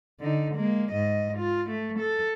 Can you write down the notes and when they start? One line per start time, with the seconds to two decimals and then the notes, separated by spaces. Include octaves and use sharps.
0.20 D3 D#4
0.55 G#3 A#3
0.92 G#2 D#5
1.38 F4
1.70 A3
2.00 A4